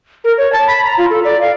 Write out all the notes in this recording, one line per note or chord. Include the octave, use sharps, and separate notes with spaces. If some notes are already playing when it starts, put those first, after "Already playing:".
A#4
C#5
A5
B5
A#5
F4
A4
D5
F5